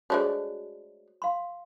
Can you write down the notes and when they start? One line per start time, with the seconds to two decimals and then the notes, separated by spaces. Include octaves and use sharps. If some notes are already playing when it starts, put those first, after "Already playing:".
0.10 G#3 A3 D4 F#4 C5 C#5
1.22 F5 C6